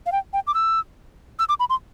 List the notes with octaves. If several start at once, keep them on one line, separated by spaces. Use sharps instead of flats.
F5
G5
G5
D6
E6
E6
D6
B5
C6